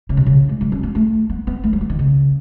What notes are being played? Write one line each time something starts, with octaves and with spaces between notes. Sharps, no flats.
C#3
B2
C#3
G#3
F#3
C#4
B3
A3
B3
B3
A3
F#3
E3
D#3
C#3